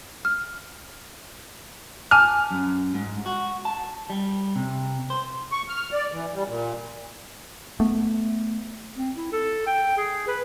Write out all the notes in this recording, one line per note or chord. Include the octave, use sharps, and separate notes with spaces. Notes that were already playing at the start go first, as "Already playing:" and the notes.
F6
G#5 A5 D6 F6
F#2
G#2
F#4
A5
G3
C3
C5
C#6
F6
D5
E3
G3
A#2
A3 B3
C4
E4
A4
G5
G#4
B4